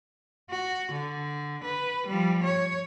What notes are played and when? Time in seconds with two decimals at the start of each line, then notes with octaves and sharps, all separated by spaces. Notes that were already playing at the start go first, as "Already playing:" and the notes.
0.50 F#4
0.92 D3
1.64 B4
2.07 F3 G3
2.44 C#5